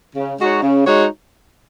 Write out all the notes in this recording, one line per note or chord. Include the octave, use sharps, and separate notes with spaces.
C#3
G#3 D#4 F#4 C#5
C#3
G#3 D#4 F#4 C#5